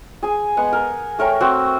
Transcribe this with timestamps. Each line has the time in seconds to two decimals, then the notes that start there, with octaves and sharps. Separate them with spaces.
0.23 G#4 G#5
0.57 G#3 B3 F#5
0.73 A#4
1.19 A3 A#4 C#5 G5
1.41 C4 F#4